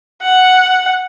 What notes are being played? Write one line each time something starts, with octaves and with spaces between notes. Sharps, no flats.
F#5